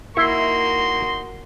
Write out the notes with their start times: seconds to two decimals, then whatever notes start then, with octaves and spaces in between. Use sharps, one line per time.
0.17 A#3 D#4 E4 F#4 C6